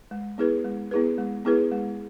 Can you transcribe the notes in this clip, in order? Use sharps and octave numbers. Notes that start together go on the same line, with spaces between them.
G#3
B3 E4 G#4 B4
G#3
B3 E4 G#4 B4
G#3
B3 E4 G#4 B4
G#3